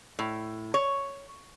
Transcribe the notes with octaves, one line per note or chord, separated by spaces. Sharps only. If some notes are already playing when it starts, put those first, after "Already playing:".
A2
C#5